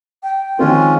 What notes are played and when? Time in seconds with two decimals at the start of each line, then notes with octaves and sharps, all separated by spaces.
0.23 G5
0.59 D#3 F3 G#3 C4 C#4 F4